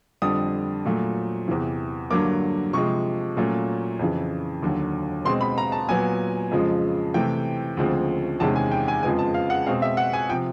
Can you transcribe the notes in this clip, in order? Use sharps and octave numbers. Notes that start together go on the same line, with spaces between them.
F2 D3 G3 D#6
A#2 F#3 A3
E2 C3 E3
G2 D3 F#3 A#3 D6
C3 F3 G#3 C#6
A#2 F#3 A3 C#4
F2 C#3 E3
D#2 D3 F#3
B2 G#3 C4 C6
B5
A#5
A5
A#2 F#3 B3 G#5
F2 C#3 F3 G#3
C3 E3 A3 G5
D2 C#3 F3 G#3 C4
E2 C3 D#3 G#3 C#4 A5
G#5
G5
G#5
F2 C#3 F3 G#3 B3 G#5
A5
F5
F#5
B2 G#3 C4 F5
E5
F#5
G#5
C3 F3 G5